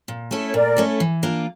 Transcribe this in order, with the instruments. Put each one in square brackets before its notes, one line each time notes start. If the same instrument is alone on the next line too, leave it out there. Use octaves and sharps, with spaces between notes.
[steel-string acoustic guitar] A#2
A3 C#4 E4 A4
[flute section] C#5
[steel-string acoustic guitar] A#2 [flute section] A#4 D5
[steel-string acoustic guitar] A3 C#4 E4 A4
E3
A#3 D4 F4